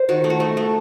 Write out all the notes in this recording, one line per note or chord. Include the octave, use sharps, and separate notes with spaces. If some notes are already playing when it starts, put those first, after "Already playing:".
Already playing: C5
D#3 F#4
A3
F#4
A3
A3